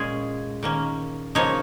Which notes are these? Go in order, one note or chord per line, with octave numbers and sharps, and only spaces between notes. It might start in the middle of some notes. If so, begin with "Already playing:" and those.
Already playing: A#2 G#3 C#4 G#4
D#3 A#3 C#4
C#3 F3 A#3 D#4 C#5